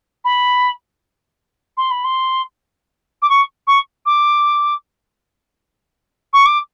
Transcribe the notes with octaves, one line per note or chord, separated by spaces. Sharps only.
B5
C6
B5
C6
D6
C#6
C#6
D6
C#6
D6